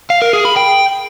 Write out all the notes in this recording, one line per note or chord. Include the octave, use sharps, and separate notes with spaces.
F5
A#4
G#4
B5
G5